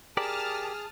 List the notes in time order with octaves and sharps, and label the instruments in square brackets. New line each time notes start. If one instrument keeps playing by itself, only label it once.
[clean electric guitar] G4 A#4 D5 [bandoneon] G#4 [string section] A5 D#6 F6